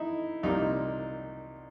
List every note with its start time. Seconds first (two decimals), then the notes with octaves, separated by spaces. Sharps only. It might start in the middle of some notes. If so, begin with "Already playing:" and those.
Already playing: D#4 E4
0.43 C2 A#2 G3 A#3 D#4